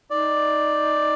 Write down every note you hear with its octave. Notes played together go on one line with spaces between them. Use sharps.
D#4 D5